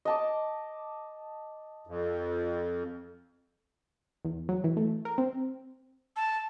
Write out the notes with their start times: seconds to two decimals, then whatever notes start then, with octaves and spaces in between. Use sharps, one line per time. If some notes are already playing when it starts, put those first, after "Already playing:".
0.05 D#5 A5 D6
1.87 F2
4.25 E2
4.49 F#3
4.64 E3
4.77 A3
5.05 A#4
5.18 C4
6.16 A5